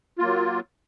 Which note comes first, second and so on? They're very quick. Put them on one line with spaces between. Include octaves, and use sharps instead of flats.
F4 A#3 F#3